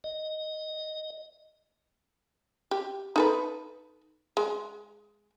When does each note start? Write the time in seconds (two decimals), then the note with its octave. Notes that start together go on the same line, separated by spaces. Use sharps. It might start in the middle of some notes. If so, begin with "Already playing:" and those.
0.04 D#5
2.71 G4
3.16 D#4 A4 B4
4.37 G#3